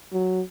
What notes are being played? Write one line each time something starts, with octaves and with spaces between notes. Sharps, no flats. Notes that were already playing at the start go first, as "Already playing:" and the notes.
F#3